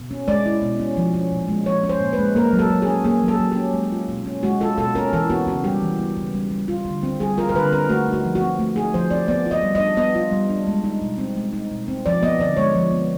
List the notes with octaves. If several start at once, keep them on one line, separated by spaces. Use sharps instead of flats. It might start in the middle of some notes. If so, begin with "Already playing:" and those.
Already playing: B2
C#4
G#3 D5
E4
B2
C#4
F3
C#4
A#2
G#3
F3 C#5
C#4
C5
A#2
B4
G#3
A#3 A#4
F#3
A4
F#3
C#4 G#4
A#3 G#4
F#3
A4
F#3
C#4 G4
G#3
F4
B2
C#4
G#3 F#4
F4 A4
B2 A4
C#4 A#4
E3 A4
B3 F#4
C#3 F#4
G3 G4
E3
B3
C#3
G3
G3
F4
D3
C4
G3 G#4
F4 A#4
A#4
D3 B4
C4 A#4
A3 F#4
D#4
F#4
F3
F#4
C4
A3
D#4 G#4
F3 C5
C4 D5
B3 D5
F4
D#5
G3
D4 D#5
B3 D#5
F4
G3
D4
G#3
D#4
B2
C4
G#3
D#4
B2
C4
F3 D5
B3 D#5
D3 D5
G#3 C#5
F3
B3